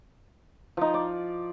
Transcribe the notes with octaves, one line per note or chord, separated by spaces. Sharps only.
F3 D#4
D5